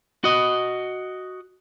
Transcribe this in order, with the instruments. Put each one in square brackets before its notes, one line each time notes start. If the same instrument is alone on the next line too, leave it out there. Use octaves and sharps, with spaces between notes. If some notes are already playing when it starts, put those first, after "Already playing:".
[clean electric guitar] F#4 D#5